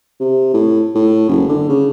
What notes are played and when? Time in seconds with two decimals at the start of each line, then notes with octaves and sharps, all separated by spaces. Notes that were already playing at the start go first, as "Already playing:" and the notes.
0.20 C3
0.54 A2
0.95 A2
1.29 F#1
1.49 D3
1.69 C#3